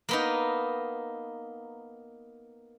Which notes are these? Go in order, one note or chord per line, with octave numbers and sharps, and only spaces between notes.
A#3 B3 D#4